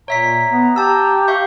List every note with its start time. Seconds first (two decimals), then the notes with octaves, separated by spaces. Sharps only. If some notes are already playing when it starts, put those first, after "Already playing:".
0.08 A#2 C#5 E5 A#5 B6
0.50 B3
0.76 G4 A5 E6
1.28 E5 F5 C#6 G6